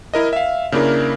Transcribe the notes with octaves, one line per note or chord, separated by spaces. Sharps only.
E4 A#4 D#5
E5 F5
C#3 A#3 D4 E4 A#4